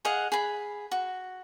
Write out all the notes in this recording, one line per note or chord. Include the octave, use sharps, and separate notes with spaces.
G#4 D#5 F5 F#5
G#4 B5
F#4